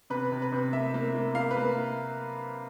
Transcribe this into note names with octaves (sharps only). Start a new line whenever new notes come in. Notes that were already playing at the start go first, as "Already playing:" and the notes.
C3 B4
C3
B4
C3
A#3 E5
A#3
A#3
A#3 F5
B4
A#3